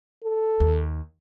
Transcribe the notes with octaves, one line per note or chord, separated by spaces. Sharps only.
A4
D#2